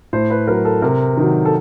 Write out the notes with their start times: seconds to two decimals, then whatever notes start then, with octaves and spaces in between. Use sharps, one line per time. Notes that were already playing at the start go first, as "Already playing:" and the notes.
0.13 A2 C5
0.30 B4
0.47 F#3 A#4
0.65 A4
0.82 C3 A#4
1.17 D#3 F#3
1.45 A4